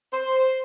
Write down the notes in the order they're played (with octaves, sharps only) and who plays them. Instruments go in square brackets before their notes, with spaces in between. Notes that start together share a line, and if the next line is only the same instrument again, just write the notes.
[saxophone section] C5